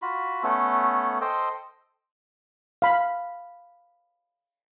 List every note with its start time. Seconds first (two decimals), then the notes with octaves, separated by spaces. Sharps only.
0.02 F4 F#4 B5
0.43 A3 B3 C#4 A4
1.21 A4 C5 D#5 G5
2.82 F5 B5